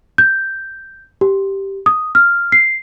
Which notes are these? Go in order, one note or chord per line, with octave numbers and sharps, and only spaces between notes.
G6
G4
D#6
F6
C7